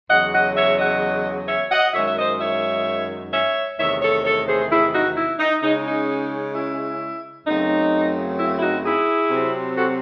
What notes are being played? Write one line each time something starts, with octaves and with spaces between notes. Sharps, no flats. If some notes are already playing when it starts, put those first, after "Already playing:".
E2 C#3 F#3 D#5 F#5
D#5 F#5
C#5 E5
D#5 F#5
C#5 E5
D#5 F#5
F#2 D#3 G#3 C#5 E5
E5
C5 D#5
C#5 E5
C#5 E5
E2 C3 D#3 A3 C#5 E5
A4 C#5
A4 C#5
G#4 C5
E4 G#4
D#4 F#4
E4
D#4
C#3 G#3 C#4 D#4
D#4
E4
F#2 C#3 F#3 A3 C4 D#4
E4
E4
D#4 F#4
E4 G#4
C3 F#3 C4
F#4 A4